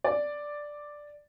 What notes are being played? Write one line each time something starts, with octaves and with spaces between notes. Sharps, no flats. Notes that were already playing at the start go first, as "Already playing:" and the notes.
D5